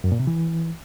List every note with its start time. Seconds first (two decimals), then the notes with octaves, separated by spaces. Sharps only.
0.04 F#2
0.12 A#2
0.20 C3
0.27 E3